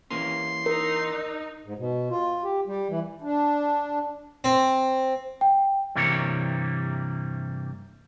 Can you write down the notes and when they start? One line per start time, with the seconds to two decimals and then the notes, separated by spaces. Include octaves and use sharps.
0.11 E3 A#3 C#4 C6
0.66 D#4 A#4
1.65 G#2
1.78 B2
2.11 F4
2.44 G4
2.67 G3
2.90 E3
3.22 D4
4.44 C4
5.41 G5
5.95 G2 C3 E3 G3 A#3 C#5